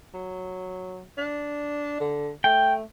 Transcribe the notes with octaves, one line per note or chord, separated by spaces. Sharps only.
F#3
D4
D3
A3 G5